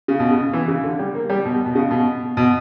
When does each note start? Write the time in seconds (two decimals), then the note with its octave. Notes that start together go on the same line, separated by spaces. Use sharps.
0.08 C#3
0.20 B2
0.31 C#3
0.53 E3
0.68 C#3
0.84 D3
0.99 G3
1.15 A#3
1.29 G3
1.45 B2
1.66 B2
1.75 C#3
1.91 B2
2.37 B2